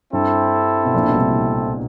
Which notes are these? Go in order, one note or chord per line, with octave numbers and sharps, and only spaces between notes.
G2 C4 E4 A4
B2
A#1 A#2
B2
C2 C3